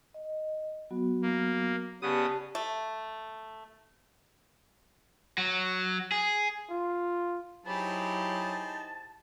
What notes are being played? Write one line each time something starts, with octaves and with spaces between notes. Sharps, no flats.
D#5
F#3 B3 F#4
A#3
C#3 B3 G4 D5 A5 D#6
A3
F#3
G#4
F4
F#3 D#4 E4 G4 G#4 C5 A5 B5